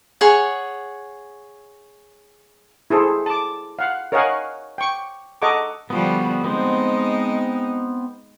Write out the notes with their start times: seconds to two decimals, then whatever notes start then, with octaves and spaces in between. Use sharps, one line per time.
0.21 G#4 C#5 F#5
2.90 E4 G#4 A4 C5
3.26 A5 D6
3.79 F5 F#5
4.12 A#4 C#5 D#5 F5 F#5 G#5
4.78 G5 C#6
5.42 A4 D#5 F#5 A#5 C#6 D6
5.90 D3 F3 G3 B3 F#4
6.44 G#3 B3 C4 D#4 C5